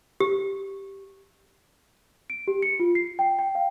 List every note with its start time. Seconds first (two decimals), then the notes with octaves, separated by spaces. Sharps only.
0.20 G4
2.30 D7
2.48 G4
2.62 C#7
2.80 F4
2.95 C7
3.19 G5
3.39 G5
3.55 F5